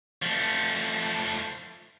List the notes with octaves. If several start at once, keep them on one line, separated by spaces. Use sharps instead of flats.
F3 A3